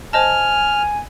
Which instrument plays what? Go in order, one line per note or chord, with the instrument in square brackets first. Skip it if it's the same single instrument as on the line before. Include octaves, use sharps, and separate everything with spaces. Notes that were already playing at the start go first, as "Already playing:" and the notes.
[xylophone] C5 D#5 A5 [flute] G#5 [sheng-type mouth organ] F6